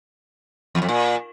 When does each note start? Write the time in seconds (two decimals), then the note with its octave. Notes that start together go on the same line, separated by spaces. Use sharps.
0.75 E2
0.82 F2
0.89 A#2